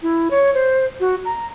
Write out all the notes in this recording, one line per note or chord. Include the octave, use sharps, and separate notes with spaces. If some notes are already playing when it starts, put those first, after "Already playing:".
E4
C#5
C5
F#4
A#5